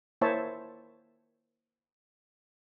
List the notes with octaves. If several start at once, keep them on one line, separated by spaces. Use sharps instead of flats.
A#3 E4 C5 C#5 E5 A5